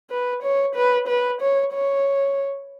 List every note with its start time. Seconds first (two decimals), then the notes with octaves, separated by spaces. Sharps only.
0.10 B4
0.43 C#5
0.75 B4
1.07 B4
1.41 C#5
1.73 C#5